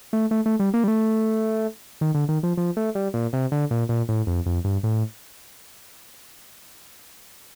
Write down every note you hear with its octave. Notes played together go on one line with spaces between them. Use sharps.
A3
A3
A3
G3
A#3
G3
A3
D#3
D3
D#3
F3
F3
A3
G3
A#2
C3
D3
A#2
A#2
A2
F2
F2
G2
A2